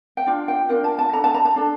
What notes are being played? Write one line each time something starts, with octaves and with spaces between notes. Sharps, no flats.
G5
D4 F4
G5
D4 F4 A#4 G5
A5
A5
D4 A4 A#5
A5
A#5
A5
D4 A4